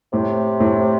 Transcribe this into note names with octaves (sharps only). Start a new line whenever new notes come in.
A2 C3
A2